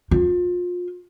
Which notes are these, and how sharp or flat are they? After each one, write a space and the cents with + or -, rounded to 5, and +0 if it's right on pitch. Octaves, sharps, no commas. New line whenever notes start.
F4 +30